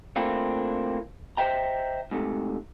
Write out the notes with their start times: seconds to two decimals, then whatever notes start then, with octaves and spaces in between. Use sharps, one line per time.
0.16 A3 A#3 C4 D4 E4 F4
1.37 C5 D#5 E5 G5 A#5
2.11 G#2 C3 A3